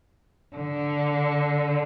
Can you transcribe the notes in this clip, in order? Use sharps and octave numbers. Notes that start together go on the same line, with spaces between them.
D3